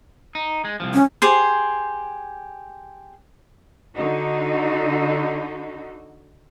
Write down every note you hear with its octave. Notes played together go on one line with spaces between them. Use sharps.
D#4
G#3
C2 F2 F3
C#4
G4 G#4 C5
D3 D#4 F#4